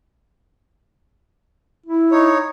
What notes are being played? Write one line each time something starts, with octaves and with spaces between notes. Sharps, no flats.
E4
D#4 C#5